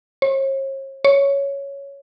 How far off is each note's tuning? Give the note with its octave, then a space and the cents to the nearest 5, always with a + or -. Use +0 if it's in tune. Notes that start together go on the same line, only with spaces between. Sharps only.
C#5 -45
C#5 +5